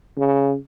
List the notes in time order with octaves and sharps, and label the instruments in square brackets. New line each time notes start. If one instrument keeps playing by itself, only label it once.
[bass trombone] C#3